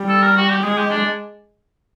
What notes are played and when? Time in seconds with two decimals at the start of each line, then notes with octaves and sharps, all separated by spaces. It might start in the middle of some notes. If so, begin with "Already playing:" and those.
Already playing: G3
0.09 A4
0.23 A#4
0.36 F#4
0.50 G4
0.63 G#3 G#4
0.78 G4
0.91 D4